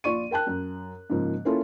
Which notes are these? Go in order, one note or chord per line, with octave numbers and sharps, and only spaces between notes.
A#1 F4 D5 C#6 D#7
A#4 G5 A5 F#6
F#2
G#2 C#3 F3 A#3
A#3 C#4 E4 F4 A4